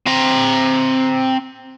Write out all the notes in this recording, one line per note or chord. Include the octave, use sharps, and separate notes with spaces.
C4 A#5